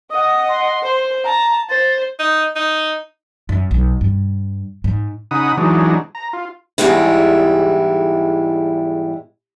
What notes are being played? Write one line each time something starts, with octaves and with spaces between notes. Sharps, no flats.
D#5 F#5 D#6
C6
C5
A5 A#5
C5 A6
D#4
D#4
F#2
B1
G2
G#2
C#3 D#4 F#5 B5 D#6
E3 F#3 G#3 D4 D#4
A#5
F4
E2 G#2 G3 G#3 E4